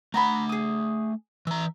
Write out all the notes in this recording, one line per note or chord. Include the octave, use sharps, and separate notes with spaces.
A3 F#5 A#5 B5
G#4 D#6
E3 E5 A#5